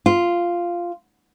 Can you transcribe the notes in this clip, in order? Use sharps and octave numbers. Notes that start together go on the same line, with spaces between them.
F4